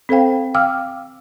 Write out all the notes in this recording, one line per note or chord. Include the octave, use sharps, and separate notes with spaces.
C4 A4 C5 F5 G5
F5 G5 D6 E6 F6